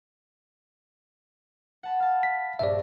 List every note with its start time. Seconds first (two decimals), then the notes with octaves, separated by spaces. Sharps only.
1.83 F#5 A5 B5
2.00 F5 A5
2.23 B6
2.59 A#1 G2 D5 E5 A#6